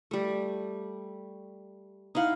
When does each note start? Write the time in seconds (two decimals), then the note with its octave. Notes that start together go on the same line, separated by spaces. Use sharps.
0.11 G3 A3
2.15 D#4 E4 F5 F#5